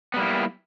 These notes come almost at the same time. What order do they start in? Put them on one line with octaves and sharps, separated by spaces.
B3 G3 A#3 E4